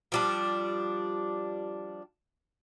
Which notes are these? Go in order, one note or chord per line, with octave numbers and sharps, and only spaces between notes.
F3 G3 D4